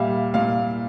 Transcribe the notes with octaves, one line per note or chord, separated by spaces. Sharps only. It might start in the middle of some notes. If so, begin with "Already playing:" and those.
Already playing: A#2 G3 E5 F5
A#2 F5